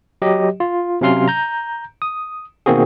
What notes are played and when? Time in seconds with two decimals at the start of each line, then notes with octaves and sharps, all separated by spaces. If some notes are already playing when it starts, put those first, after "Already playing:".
0.22 F#3 G4 D#5
0.60 F4
1.01 C3 F#3 C#4 F5 C6 F6
1.28 A#5 G6
2.02 D#6
2.66 B2 D#3 A#3 C4 F#4 G#4